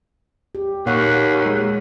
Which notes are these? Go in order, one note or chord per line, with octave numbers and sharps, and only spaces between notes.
G4
D#2 A#2 C#5 F#5
G#3